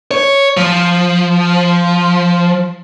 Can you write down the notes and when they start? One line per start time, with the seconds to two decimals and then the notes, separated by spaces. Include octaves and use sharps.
0.11 C#5
0.57 F3